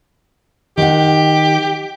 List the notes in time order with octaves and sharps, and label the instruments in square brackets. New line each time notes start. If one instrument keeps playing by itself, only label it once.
[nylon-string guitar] D#3 F#5 [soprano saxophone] G4